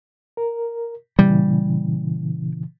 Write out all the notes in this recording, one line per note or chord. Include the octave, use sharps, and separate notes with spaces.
A#4
A#2 C#3 E3 G3